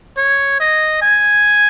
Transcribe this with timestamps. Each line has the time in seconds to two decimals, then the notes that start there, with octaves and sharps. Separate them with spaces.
0.17 C#5
0.60 D#5
1.02 G#5